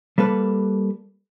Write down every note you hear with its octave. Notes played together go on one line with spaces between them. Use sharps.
G3 A#3 A4 B4